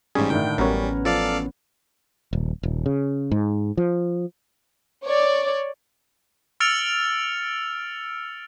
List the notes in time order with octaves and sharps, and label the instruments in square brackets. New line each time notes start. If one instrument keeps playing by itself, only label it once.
[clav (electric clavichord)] A1 G#4 [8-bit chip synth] G#2 G3 [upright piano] C#4
[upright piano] A2 D3 D#3 [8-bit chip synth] G5
[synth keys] A1 B3 C#4 [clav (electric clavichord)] F#2 C#5 [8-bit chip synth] G3 [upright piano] A#4
[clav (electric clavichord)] F3 [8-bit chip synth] A4 D5 F5
[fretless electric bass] D#1
D#1
C#3
G#2
F3
[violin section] C#5 D5
[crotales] E6 F6 A6 C#7 D7 F7